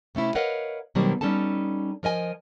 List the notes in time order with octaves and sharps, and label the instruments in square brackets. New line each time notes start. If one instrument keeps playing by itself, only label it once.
[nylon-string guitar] C3 A3 C#4 E4
A#4 B4 C#5 D#5 F5 F#5
B2 D#3 F#3 G3 A#3 C4
G3 C#4 D#4 A4 A5
F3 A#4 D#5 G#5